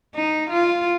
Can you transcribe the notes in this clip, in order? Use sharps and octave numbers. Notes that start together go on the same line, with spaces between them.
D#4
F4